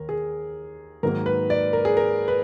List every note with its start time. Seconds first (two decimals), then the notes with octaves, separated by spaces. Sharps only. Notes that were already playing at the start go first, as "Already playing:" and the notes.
Already playing: D#2 A#4
0.09 G#4
1.03 G#2 D#3 F#3 A#3 A#4
1.26 B4
1.50 D5
1.73 A#4
1.85 G#4
1.97 A#4
2.28 B4